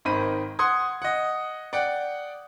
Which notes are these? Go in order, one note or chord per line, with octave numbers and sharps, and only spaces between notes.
G#1 D#3 C5 B5 D#7
F#5 C6 D#6 G#6
D#5 F#5
D5 F#5 G5